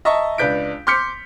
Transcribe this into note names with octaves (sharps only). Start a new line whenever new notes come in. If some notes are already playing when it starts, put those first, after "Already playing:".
D#5 E5 A5 A#5 C#6
C#2 D4 B4 G6 B6 D7
C6 D6 F6 G6 B6 C#7